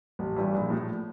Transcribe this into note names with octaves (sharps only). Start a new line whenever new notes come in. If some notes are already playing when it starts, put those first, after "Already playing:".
A1
G2 E3
A#1
A2 F3